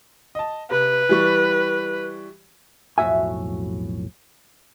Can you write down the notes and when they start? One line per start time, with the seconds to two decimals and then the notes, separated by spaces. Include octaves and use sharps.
0.35 D#5 A5
0.71 C3 B4
1.09 E3 G3 C#6
2.98 B1 F2 A2 F#4 E5 G#5